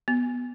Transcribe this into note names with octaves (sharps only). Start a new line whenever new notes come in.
B3